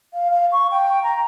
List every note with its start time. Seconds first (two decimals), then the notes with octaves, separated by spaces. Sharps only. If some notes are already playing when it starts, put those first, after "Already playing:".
0.14 F5
0.31 F5
0.52 C#6
0.71 G5
1.03 A#5